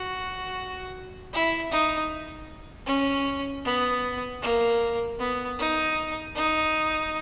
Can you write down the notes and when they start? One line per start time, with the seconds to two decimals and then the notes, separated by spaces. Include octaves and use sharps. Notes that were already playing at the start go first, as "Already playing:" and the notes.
Already playing: F#4
1.33 E4
1.71 D#4
2.87 C#4
3.65 B3
4.42 A#3
5.19 B3
5.58 D#4
6.35 D#4